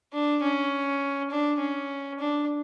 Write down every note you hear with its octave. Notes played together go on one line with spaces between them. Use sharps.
D4
C#4
D4
C#4
D4